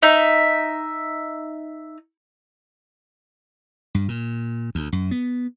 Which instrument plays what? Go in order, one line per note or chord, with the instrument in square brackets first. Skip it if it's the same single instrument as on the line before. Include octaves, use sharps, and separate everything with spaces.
[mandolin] D#4 E5
[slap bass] G2
A#2
D2
F#2
B3